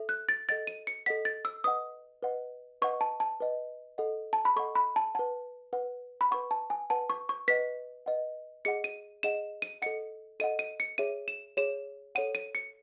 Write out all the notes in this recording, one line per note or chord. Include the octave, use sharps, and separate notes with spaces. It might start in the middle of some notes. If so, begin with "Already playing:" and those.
Already playing: A4 E5
F#6
A6
A4 D#5 F#5 A6
D#7
C#7
A4 D#5 F#5 B6
A6
E6
B4 D#5 F#5 D#6
B4 D#5 F#5
B4 D#5 F#5 C#6
A5
A5
B4 D#5 F#5
A4 D#5 F#5
A5
B5
A4 D#5 F#5 C#6
B5
A5
B4 F#5 A5
B4 F#5
B5
B4 F#5 C#6
A5
G#5
B4 F#5 A5
C#6
C#6
B4 D#5 F#5 B6
B4 D#5 F#5
G#4 D#5 F#5 C#7
D#7
G#4 D#5 F#5 E7
D#7
A4 D#5 F#5 C#7
A4 D#5 F#5 D#7
D#7
C#7
G#4 C#5 E5 D#7
E7
G#4 C#5 E5 E7
A4 C#5 F#5 D#7
D#7
C#7